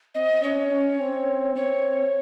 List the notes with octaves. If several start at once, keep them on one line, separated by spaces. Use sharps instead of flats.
C4 D#5
C#4 C#5
C#4
C4
C4 C#5